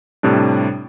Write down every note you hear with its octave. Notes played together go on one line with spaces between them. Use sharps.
A2 C3 G3 D4